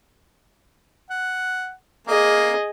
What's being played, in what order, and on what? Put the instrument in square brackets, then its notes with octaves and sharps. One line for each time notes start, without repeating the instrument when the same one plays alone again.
[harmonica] F#5
[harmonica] A#3 [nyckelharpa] G#4 D#5